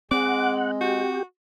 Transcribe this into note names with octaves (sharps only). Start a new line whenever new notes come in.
G#3 C4 F#5 D6
F#4 G4